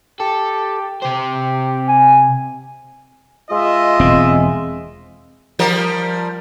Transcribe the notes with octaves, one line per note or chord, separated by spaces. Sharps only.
G4 A4
C3 G4 C5
G#5
G#3 F4 D#5 E5
E1 C4
F3 G3 A#4